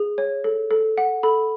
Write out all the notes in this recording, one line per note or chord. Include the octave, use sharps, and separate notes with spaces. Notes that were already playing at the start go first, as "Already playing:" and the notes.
Already playing: G#4
C#5
A4
A4
F#5
A4 B5